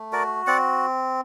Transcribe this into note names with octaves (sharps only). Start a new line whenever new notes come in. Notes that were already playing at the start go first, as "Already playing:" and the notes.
Already playing: A3
F#4 A#4 D5
C4 D5 F#5